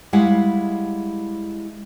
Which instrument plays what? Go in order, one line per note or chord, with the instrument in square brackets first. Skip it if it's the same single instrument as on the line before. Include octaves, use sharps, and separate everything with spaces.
[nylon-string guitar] G3 G#3 E4 F5 F#5